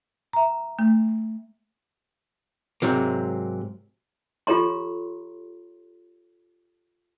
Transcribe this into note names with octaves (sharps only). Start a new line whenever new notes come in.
E5 A#5
A3
G#2 C3 F#3 A#3
F4 G4 A4 C#5 A#5 C6